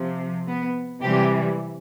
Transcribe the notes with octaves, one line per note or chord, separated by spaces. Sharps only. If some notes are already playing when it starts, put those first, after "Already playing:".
Already playing: C3 F3
B3
C3 E3 G3 G4